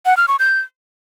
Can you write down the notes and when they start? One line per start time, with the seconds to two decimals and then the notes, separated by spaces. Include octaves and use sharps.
0.06 F#5
0.17 F6
0.28 C#6
0.39 G6